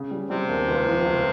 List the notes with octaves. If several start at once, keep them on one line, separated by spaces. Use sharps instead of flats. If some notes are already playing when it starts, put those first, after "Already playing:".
Already playing: C#3
G3
C3 G3 C4
D#2
C#2
F3
C#2